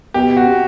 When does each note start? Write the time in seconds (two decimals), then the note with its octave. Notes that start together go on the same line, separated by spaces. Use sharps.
0.14 B2 G4
0.37 F#4
0.48 C3